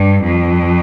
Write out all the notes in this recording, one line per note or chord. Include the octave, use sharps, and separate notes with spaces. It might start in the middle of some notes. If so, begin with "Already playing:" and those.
Already playing: G2
F2